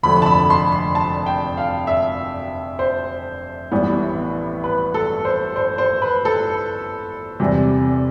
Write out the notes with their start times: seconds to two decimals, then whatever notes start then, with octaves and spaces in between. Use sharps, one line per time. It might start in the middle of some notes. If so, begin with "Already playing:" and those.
0.03 F1 F2 D3 A3 B5
0.22 A5
0.26 B5
0.50 C6
0.72 C6
0.95 A5
1.26 G5
1.57 F5
1.87 E5
2.79 C5
3.71 A1 A2 E3 G3 B3
4.64 B4
4.94 A4
5.25 C5
5.56 C5
5.78 C5
6.02 B4
6.25 A4
7.40 E2 C3 G3